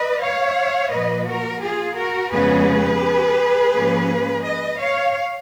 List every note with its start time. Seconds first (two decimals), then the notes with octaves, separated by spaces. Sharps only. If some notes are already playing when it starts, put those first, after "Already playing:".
Already playing: B4 D#5
0.22 C#5 F5
0.92 A#2 F3 A#3 B4 D#5
1.28 F#4 A#4
1.63 F4 G#4
1.98 F#4 A#4
2.33 F2 C#3 G#3 B3 G#4 B4
3.73 G#2 F3 A#3 C#4
4.44 B4 D#5
4.79 C#5 F5